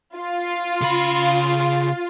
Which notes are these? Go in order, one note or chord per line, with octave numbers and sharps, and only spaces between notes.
F4
C#3 B5